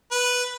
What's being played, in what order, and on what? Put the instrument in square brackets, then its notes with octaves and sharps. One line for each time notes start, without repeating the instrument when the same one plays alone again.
[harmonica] B4